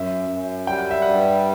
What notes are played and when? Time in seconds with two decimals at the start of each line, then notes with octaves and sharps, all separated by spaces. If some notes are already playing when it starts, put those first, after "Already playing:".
Already playing: F#2 E5
0.30 F#2
0.67 G3 G5
0.79 F#5
0.91 E5
1.02 G2 F#5